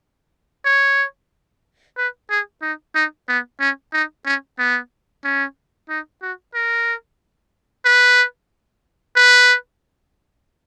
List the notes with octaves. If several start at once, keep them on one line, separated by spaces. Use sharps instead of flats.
C#5
B4
G#4
D#4
D#4
B3
C#4
D#4
C#4
B3
C#4
D#4
F#4
A#4
B4
B4